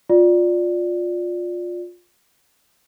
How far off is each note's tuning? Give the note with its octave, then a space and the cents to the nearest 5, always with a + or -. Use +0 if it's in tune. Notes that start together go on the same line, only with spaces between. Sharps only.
F4 +20 D5 +0